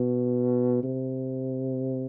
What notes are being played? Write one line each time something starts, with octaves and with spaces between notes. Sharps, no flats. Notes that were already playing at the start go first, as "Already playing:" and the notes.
Already playing: B2
C3